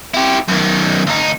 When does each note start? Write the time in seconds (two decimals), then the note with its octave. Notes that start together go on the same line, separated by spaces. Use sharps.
0.14 E4 G4
0.48 F#2 D#3
1.07 D2 D#4